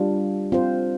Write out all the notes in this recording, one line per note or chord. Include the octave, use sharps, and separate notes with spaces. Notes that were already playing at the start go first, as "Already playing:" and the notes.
Already playing: G3 D4 F4
C4 F4 C5